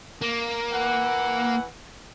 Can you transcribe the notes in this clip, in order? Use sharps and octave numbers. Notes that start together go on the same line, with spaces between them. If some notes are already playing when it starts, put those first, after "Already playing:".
A#3
E3 F#5